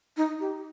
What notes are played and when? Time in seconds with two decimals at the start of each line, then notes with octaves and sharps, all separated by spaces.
0.17 D#4
0.40 G4